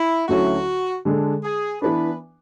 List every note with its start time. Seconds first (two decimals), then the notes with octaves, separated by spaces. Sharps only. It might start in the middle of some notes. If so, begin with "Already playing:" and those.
Already playing: E4
0.28 D2 D3 F#3 C#4 E4 F#4
1.05 D3 G#3 D4 A4
1.44 G#4
1.82 E3 B3 D4 B4